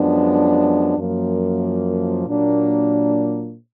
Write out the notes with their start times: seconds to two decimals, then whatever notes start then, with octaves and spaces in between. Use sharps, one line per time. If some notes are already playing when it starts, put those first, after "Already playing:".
Already playing: F#2 F3 G#3 B3 D4
0.97 F#2 F3 A#3
2.26 A#2 F#3 A#3 D4